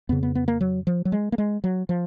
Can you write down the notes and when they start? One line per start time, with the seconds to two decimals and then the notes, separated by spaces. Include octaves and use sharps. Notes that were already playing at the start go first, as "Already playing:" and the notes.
0.09 F2 C#3 B3
0.23 B3
0.35 B3
0.48 A#3
0.61 F#3
0.87 F3
1.05 F#3
1.12 G#3
1.32 A#3
1.38 G#3
1.64 F#3
1.89 F3